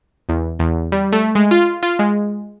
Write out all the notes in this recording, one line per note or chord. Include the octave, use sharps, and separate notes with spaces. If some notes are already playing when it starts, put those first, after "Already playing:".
E2
E2
G3
A3
G#3
F4
F4
G#3